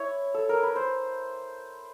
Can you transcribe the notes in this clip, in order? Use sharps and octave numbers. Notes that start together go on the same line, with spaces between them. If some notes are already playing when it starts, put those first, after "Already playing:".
Already playing: E4 C#5
A4
A#4
B4
C5